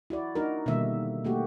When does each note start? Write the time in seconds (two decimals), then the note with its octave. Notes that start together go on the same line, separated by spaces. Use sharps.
0.10 E4 F#4 D5
0.35 D4 D#4 F#4 A#4
0.66 B2 D3 D#3 G3 A#3 E5
1.25 A3 A#3 F#4 G4